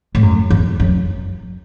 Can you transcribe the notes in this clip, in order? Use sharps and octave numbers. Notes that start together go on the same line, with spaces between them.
A2
F#2
E2
F#2